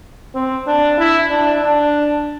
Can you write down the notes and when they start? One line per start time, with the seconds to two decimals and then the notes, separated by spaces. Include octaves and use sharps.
0.35 C4
0.67 D4
0.99 E4
1.30 D4
1.61 D4